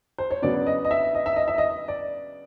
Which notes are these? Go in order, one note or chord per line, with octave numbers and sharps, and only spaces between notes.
C5
C#5
C#3 F#3 B3 D4 D5
D#5
D#5
E5
D#5
E5
D#5
E5
D#5
D5